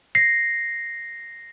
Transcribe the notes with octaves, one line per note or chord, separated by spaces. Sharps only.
A#6 C7